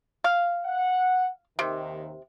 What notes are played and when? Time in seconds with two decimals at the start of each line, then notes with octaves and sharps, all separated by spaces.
0.24 F5
0.65 F#5
1.59 D#2 C3 D#3